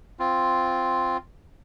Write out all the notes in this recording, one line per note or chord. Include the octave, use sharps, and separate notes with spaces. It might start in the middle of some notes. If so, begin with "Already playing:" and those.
C4 F4